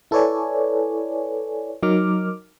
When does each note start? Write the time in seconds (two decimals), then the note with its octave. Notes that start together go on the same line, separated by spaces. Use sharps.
0.11 E4 A4 B4 C#5 D5 G#5
1.83 F#3 D#4 A#4 D6 F6